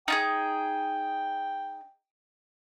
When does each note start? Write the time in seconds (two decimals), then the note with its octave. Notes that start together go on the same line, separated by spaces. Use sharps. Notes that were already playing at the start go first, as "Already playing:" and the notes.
0.08 D#4 F4 G#4 G5